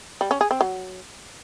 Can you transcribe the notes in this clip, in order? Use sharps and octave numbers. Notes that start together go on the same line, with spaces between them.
G3
C#4
G#4
C4
F#3